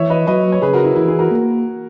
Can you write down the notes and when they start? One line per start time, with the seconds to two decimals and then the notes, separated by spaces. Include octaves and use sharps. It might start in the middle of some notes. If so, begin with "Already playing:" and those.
Already playing: E3 C#5 E5
0.10 B4 D#5
0.27 F#3 B4 D#5
0.52 C#5
0.62 C#3 G#4 B4
0.73 F#4 A#4
0.84 E4
0.96 E3 E4
1.08 E4 G#4
1.19 F#4 A#4
1.31 A#3